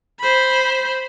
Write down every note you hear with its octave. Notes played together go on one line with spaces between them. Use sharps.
C5 B5